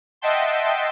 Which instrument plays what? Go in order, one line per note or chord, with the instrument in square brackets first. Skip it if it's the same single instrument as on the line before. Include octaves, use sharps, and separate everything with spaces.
[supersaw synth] D#5 E5 F#5 G5 A5 C6